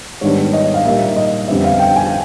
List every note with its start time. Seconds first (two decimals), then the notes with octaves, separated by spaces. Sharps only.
0.21 G#2 D#3 G3 B3 D4 C#5
0.53 D#5
0.74 F5
0.85 A#2 G3 A#3 D#4 E5
1.16 D#5
1.48 F2 D3 G3 B3 E5
1.64 F5
1.79 G5
1.96 G#5
2.06 G#5